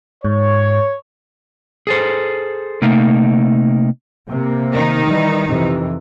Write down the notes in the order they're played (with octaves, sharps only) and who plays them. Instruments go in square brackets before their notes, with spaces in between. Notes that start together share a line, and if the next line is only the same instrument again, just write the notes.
[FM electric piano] G#2 [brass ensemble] C#5
[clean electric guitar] G#4 A4 C5
C3 A3 A#3 D#4
[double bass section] C3 A#3
[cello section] D#3 D#4
[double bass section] E3 G3
F2 C3 E3